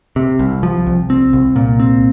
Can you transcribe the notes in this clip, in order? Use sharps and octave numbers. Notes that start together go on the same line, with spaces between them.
C3
C2
F3
C2
C4
C2
A#2
C4